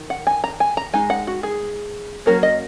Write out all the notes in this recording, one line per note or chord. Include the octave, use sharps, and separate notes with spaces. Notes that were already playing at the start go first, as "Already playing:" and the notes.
Already playing: D#3
F#5
G#5
A#5
G#5
A#5
G#3 D#4 G#5
F#5
F#4
G#4
F#3 A#3 C#4 A#4
D#5